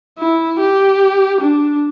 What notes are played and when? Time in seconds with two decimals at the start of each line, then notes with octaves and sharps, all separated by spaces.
0.19 E4
0.60 G4
1.41 D4